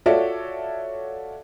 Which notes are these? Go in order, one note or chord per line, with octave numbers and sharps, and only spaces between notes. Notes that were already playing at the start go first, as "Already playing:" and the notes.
F4 F#4 A4 C#5 D5 E5